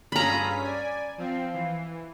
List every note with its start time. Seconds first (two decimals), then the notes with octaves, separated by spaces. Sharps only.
0.12 G2 C#4 F4 G#4 A4 A#5 B5 B6
0.64 D5 G#5
1.18 F3 C4 F5
1.54 E3